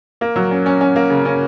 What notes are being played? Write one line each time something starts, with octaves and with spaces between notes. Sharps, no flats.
A#3
F#3
C#4
C#4
C#4
A#3
C#3
C#4